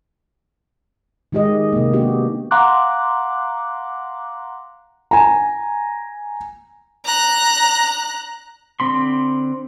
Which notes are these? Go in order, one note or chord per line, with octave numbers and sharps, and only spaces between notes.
D#3 G#3 G4 G#4 D#5
C3 A#3
B3 D4 F#4 G4
F5 F#5 A#5 C6 D6 F#6
G#5 A#5
A#5 F#6
D3 C4 B5 C6